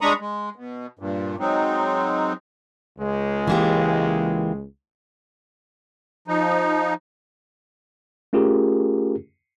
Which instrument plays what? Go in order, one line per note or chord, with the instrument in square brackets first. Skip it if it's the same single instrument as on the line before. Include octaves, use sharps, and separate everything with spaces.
[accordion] G#3 D4 A#5 B5 C#6 D#6
G#3
B2
G2 A#2
F#3 G#3 C4 D#4
[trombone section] C#2 G#3
[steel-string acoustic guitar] E3 A#3 G4
[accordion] F3 D#4
[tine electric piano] A3 C#4 F4 G4 G#4 A#4